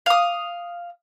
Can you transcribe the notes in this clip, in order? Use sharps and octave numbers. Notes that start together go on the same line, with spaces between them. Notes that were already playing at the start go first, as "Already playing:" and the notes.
F5 D#6